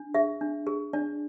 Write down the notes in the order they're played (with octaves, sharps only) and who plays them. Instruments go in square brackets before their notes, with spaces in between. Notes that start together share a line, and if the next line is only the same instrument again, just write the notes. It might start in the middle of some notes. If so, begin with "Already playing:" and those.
Already playing: [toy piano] D4
G#4 E5
D4
G#4
D4 D5